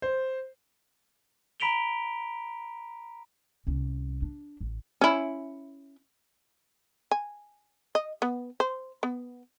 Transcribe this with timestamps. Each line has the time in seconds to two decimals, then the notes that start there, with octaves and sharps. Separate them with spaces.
0.02 C5
1.60 A#5 B5 B6 D7 F7 G7
3.67 C2 C#4
4.22 D4
4.61 A1
5.01 C#4 E4
7.11 G#5
7.95 D#5
8.22 B3
8.60 C5
9.03 B3